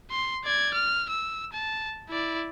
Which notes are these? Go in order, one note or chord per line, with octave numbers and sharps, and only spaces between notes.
C6
D5 G#6
F6
E6
A5
E4 D5